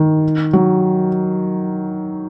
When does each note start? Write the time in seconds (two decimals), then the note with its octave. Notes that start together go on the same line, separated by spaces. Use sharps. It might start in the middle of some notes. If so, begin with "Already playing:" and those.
Already playing: D#3
0.53 F#3